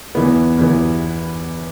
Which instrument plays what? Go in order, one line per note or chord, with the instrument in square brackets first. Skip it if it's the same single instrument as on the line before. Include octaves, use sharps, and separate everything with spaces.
[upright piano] E2 E3 B3
E2 E3 B3